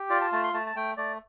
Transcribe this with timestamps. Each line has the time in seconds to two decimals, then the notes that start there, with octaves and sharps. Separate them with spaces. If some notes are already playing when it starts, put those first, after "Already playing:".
Already playing: G4
0.10 F4 D5
0.21 A5
0.33 A3 A5
0.43 C6
0.54 A3 A5
0.66 A5
0.76 A3 G5
0.97 A3 D5